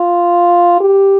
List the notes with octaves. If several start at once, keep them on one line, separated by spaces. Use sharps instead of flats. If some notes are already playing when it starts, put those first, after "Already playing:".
Already playing: F4
G4